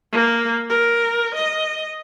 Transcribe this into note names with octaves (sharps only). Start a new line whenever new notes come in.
A#3
A#4
D#5